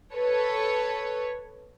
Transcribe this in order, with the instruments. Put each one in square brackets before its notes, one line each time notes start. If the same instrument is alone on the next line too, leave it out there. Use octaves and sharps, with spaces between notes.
[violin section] A4 B4 C#5